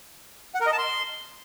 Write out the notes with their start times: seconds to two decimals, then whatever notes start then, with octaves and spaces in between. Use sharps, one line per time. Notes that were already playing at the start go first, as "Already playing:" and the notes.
0.55 F#5
0.61 A#4
0.67 D#5
0.73 A5
0.79 C6